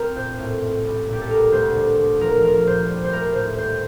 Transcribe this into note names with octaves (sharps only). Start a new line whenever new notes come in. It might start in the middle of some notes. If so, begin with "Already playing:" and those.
Already playing: C4 A#4
A#2 C5
A2
A2
C2
A#2
G4
A4
D2 A#4
D2 C5
D3
D3
F3 A#4
F3 A#4
A#2 C5
G3
C5
A3 A#4
A2 C5
D#2 C5